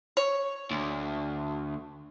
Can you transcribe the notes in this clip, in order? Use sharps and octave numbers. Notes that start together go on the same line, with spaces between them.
C#5
D2